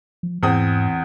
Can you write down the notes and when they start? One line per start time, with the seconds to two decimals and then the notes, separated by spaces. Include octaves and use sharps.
0.23 F3
0.43 E2 G#2 C4 D#6